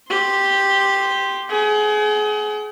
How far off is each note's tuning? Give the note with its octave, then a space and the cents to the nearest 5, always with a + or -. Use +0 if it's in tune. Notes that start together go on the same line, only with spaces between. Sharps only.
G4 +0 C6 +0
G#4 +30 G5 -45